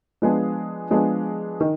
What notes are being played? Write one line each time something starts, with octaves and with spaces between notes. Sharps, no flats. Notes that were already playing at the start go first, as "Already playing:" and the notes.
F3 G#3 B3 D4 G#4
F3 G#3 B3 D4 G#4
D#3